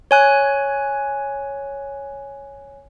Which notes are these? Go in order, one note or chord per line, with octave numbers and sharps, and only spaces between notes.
C#5 G#5 F#6